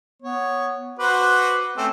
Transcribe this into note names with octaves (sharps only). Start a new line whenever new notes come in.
B3 C#5
F#4 B4 C5 D6
A3 C4 C#4 E6